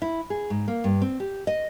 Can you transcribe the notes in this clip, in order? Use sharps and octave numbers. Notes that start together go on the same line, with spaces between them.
E4
G#4
G#2
A#3
G2
C4
G4
D#5